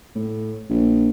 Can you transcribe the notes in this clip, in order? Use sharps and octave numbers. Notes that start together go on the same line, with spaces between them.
A2
A#1